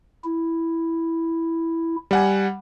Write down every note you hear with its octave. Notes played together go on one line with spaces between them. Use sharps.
E4
G3 F#5 G#5